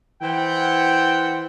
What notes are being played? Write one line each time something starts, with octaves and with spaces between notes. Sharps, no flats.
E3 C5 F#5 G5